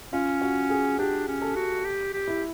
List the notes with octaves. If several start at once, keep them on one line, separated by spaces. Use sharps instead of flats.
C#4 F4
F#4
G#4
D4 G4
C#4
A4
F#4
G4
G4
E4